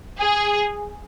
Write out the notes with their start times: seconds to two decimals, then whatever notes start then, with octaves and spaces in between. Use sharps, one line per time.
0.20 G#4